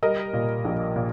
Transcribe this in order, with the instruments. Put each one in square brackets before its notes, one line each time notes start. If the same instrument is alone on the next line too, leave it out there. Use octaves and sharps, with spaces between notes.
[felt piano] G3 A#4 D#5
A#2
A#1
A#2